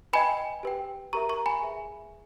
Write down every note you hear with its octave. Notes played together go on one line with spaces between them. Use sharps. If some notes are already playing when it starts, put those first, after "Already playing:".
B4 D#5 G5 G#5 B5
G4 B4 G5
G4 A#4 E5 A#5 C#6
A#5 C#6
G#5 B5
G#4 B4 E5